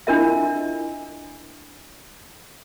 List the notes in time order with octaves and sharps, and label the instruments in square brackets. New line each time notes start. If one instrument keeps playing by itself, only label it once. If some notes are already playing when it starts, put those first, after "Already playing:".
[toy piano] D4 E4 F4 A#4 D#5 E5